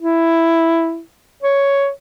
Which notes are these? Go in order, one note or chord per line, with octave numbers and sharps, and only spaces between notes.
E4
C#5